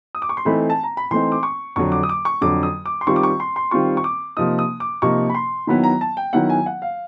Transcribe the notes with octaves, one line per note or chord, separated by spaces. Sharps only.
D#6
D6
C#6
C6
E3 A3 C4 D#4 B5
A5
A#5
B5
E3 A3 C4 D#4 C6
D6
C#6
F2 D3 F#3 C#6
D6
D#6
D6
C#6
F2 D3 F#3 D6
D#6
D6
C6
D#3 G3 C4 F4 C#6
D6
C#6
C6
C6
D#3 G3 C4 F4 C#6
C#6
D6
C3 F3 A#3 D#4 D#6
D#6
D6
C3 F3 A#3 D#4 C#6
B5
C6
D#3 F#3 B3 E4 B5
A#5
A5
G5
D#3 F#3 B3 E4 F#5
G#5
F#5
F5